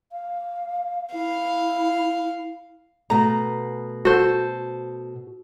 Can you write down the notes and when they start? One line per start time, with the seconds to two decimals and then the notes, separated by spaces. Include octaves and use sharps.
0.12 F5
1.14 E4 F5
3.10 B2 A3 A#5
4.05 F#4 A4 C5